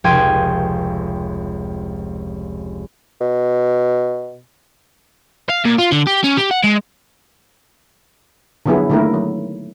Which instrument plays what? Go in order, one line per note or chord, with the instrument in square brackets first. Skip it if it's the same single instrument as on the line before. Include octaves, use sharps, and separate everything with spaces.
[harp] F1 C#2 G5 C6 G#6 D#7
[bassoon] B2
[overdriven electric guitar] F5
A#2
F4
D3
G4
C#4
G4
F#5
G#3
[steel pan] D3 F3 F#3 B3 E4 G#4
D3 D#3 A3 A#3 E4 A#4
F#3